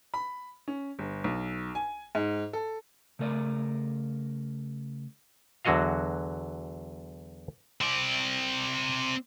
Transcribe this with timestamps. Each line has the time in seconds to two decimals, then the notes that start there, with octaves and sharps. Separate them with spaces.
0.14 B5
0.68 C#4
0.99 G1
1.24 B1
1.75 G#5
2.15 G#2
2.53 A4
3.19 C#3 A3 A#4 D5
5.65 E2 D3 F#3 F#4 D#5 F5
7.81 C4 D5